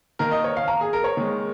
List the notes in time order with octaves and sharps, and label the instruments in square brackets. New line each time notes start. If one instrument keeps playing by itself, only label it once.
[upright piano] D#3 A#3 A#4
D#5
C#5
F5
A#5
G#4
A#4
C#5
D#3 G#3